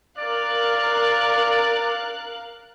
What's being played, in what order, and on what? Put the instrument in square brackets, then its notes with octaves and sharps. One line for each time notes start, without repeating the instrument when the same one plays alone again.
[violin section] A#4 F5 F#6 [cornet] D5